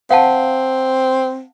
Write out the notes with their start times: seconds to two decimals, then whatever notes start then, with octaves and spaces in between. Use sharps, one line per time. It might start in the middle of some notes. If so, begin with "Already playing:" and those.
0.11 C4 F5 F#5 A5